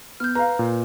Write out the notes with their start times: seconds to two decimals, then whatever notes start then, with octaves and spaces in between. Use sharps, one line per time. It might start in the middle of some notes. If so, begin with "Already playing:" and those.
0.20 B3 F6 G6
0.35 B4 F5 A#5
0.59 A#2